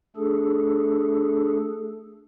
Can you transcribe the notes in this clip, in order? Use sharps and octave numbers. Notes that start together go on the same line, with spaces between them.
A3 D4 G#4 A4